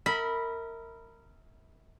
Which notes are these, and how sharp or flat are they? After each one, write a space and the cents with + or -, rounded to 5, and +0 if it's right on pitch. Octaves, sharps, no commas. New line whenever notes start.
A#4 -20 E5 -40 B5 -10